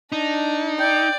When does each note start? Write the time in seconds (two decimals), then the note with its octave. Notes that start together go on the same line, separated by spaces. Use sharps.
0.12 D4 D#4
0.80 D5 G5